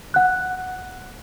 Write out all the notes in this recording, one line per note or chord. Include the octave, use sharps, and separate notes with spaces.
F#5 F#6